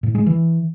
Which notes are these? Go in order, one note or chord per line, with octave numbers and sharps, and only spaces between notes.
A2
G#3
E3